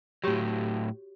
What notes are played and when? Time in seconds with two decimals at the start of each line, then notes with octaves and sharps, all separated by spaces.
0.24 A2 F#3 F#4 G4 C#5